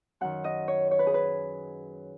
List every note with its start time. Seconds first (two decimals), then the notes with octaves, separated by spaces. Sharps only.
0.21 F#2 D#3 F#5
0.44 D#5
0.68 C#5
0.91 C#5
0.99 B4
1.07 G#4
1.14 B4